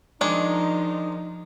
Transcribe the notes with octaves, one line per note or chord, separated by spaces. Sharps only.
D#3 F3 G#3 D4 D#4